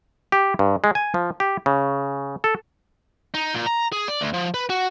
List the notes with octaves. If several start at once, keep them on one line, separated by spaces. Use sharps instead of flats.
G4
G2
G#3
G#5
F3
G4
C#3
A4
D#4
A#2
A#5
G#4
D5
D2
F3
B4
F#4